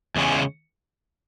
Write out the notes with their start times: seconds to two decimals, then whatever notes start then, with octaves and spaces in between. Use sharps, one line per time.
0.16 E2 C#3 G#3 C#4